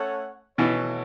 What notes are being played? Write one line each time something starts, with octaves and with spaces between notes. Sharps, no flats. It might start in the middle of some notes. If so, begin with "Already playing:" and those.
Already playing: A3 C#4 A4 C#5 F#5
B2 E3 A3 F#4 A4 C#5